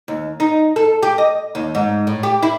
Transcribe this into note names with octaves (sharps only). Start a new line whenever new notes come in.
D#2
D#4
A4
G4
D#5
D#2
G#2
A2
G4
E4